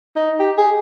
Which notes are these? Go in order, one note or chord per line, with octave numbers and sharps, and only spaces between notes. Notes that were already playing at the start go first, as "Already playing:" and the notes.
D#4
G4
G#4